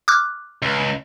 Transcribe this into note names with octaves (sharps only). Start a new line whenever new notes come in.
D6 F6 F#6
C#2